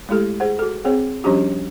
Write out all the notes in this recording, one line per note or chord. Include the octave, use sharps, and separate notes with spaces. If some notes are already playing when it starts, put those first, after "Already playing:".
G#3 A3 E4 G4 A4
G#4 C5 F#5
F#4 A4
C4 G#4 C5 C#5 F#5
F3 G3 C#4 D4 F#4 G4